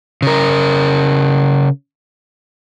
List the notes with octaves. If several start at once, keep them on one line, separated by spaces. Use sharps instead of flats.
C#3 A#4